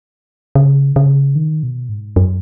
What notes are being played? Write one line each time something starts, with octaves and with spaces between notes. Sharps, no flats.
C#3
C#3
D#3
B2
G#2
F#2